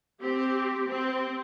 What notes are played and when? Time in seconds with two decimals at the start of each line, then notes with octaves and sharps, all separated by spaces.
0.22 C4 G4
0.87 C4